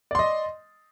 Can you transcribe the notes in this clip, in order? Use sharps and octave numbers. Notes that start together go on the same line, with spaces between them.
D5 D#5 C6